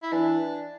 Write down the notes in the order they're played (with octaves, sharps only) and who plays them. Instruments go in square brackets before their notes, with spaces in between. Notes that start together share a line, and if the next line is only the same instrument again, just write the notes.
[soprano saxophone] E4
[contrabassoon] E3 [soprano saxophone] D4